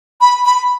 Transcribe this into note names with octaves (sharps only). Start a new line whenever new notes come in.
B5
B5